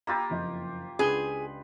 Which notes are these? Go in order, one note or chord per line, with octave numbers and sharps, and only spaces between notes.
A#3 F4 G4 B5 E6 A6
F#1 F2 D#5
C#2 D4 G#4 B4 G7